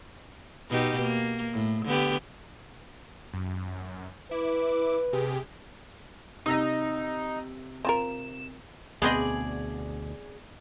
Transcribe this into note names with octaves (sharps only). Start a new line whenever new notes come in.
B2 D#4 G4
A#3
A2
D3 B3 G4
F#2
E4 B4 D6
C3 G4 G#4
C3 D#4 E6 A#6
C4 F4 A#4 E7
D2 B2 B3 C4 G#4 D5 D#5